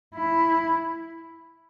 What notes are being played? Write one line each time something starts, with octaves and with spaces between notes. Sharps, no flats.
E4